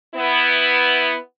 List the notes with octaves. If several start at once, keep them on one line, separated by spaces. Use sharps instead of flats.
B3 E4